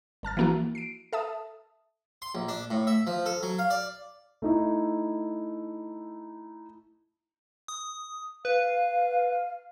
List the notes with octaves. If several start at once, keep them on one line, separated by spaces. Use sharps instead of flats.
G1 A5 F6 A6
E3 F3 A#3 E4 F#4
C7 D7
A4 E5 A5 D#6
C6
A#1
D4
A2
E5
F3
A4
F#3
F5
D5
A3 D#4 E4
D#6
B4 F5